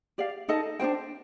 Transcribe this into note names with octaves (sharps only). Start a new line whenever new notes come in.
G4 D5 F5
D#4 A4 D#5 A5
D4 F4 C5 G5